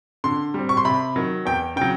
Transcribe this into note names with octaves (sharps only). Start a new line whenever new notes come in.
D3 C6
G3 C4
C#6
C6
C3 B5
D#3 F#3
E2 G5
C#3 G5
F#3